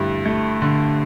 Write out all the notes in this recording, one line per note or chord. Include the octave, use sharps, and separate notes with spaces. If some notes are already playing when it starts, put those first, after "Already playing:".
Already playing: G2 D3 A3 E4
A3
D3